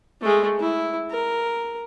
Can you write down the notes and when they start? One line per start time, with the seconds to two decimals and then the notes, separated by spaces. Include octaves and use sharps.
0.21 G#3 A3
0.60 E4
1.10 A#4